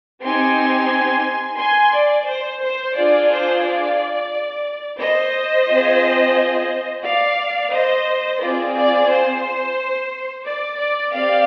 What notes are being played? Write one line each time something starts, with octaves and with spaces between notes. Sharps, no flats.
C4 D#4 G4 G#5 C6
G#5 C6
D5
C5
C5
D4 F4 G#4 D5
C5
D5
C5 D#5
C4 F4 G#4
D5 F5
C5 D#5
C4 F4 G#4 D5
D5
C5
D5
D5
C4 G4 D5 F5